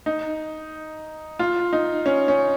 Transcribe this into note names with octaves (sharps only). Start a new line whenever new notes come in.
D#4
F4
D#4
C#4
C#4